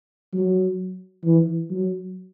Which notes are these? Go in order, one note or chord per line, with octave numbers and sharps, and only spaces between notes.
F#3
E3
F#3